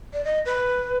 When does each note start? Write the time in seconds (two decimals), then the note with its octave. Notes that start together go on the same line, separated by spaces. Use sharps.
0.13 D5
0.25 D#5
0.46 B4